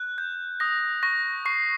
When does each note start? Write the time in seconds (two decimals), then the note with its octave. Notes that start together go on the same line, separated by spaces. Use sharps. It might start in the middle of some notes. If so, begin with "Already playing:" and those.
Already playing: F#6
0.18 G6
0.60 D#6 A#6
1.03 C#6 A#6
1.46 C#6 C7